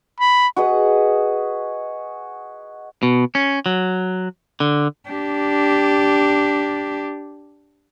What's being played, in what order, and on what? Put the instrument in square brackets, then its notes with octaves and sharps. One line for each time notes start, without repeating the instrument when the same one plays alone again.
[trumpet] B5
[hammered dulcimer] F#4 G#4 B4 D#5
[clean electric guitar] B2
C#4
F#3
D3
[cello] D4 G4